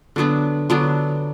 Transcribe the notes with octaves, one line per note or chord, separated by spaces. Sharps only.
D3 F#3 B3 D4
D3 F#3 B3 D4